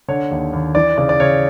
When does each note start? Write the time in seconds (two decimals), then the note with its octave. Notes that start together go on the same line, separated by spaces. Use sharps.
0.08 D3 C#5
0.31 D#2
0.53 D#2
0.75 E3 D5
0.98 C#3 D5
1.09 D5
1.20 C#3 C#5